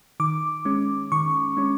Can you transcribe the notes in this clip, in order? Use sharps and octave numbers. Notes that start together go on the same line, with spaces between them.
D#3 D6
G#3 C#4
D#3 C#6
G#3 C#4